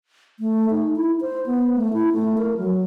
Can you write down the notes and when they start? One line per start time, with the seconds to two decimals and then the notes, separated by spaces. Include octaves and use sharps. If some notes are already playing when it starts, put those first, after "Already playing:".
0.40 A3
0.71 D#4
0.96 E4
1.21 C5
1.46 B3
1.76 A3
1.93 E4
2.12 A3
2.38 A#4
2.57 F#3